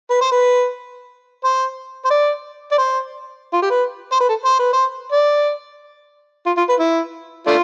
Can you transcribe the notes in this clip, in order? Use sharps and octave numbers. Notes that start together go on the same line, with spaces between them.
B4
C5
B4
C5
C5
D5
D5
C5
F4
G4
B4
C5
B4
A4
C5
B4
C5
D5
F4
F4
B4
E4
A3 D4 F4